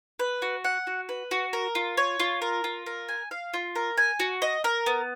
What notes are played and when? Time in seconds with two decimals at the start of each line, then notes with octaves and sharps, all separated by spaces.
0.19 B4
0.42 F#4
0.64 F#5
0.87 F#4
1.09 B4
1.31 F#4
1.53 A#4
1.75 F4
1.97 C#5
2.20 F4
2.42 A#4
2.64 F4
2.86 A#4
3.09 G#5
3.31 F5
3.54 F4
3.75 A#4
3.98 G#5
4.20 F#4
4.42 D#5
4.64 A#4
4.86 B3